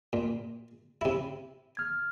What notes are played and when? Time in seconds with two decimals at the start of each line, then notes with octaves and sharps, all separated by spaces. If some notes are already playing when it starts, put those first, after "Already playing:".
0.13 A#2
1.01 C3 E4
1.77 F6 G#6